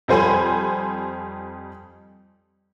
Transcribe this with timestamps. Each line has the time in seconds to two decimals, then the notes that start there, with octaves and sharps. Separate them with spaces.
0.08 F2 G3 C5 G#5 B5